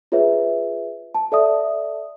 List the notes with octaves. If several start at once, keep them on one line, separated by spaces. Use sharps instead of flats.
F4 G#4 B4 C#5 E5
A5
A4 D5 E5 D#6